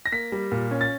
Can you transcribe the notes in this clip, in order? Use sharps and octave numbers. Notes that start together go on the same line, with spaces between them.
A#6
A#3 B6
G3
A#2
C#4
A6